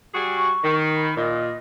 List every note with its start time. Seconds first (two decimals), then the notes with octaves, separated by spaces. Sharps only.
0.14 G3 F#4 G#4
0.38 C#6
0.64 D#3
0.96 B5
1.17 A#2 D#5